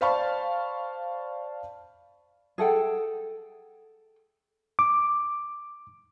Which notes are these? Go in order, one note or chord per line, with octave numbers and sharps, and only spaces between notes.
C5 D5 F5 A5 B5 C#6
G#4 A4 F#5 G5
D6